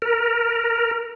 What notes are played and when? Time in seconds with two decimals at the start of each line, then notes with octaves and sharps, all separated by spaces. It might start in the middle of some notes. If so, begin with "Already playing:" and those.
0.02 A#4